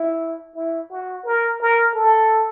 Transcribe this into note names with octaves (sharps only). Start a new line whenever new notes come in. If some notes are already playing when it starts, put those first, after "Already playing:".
Already playing: E4
E4
F#4
A#4
A#4
A4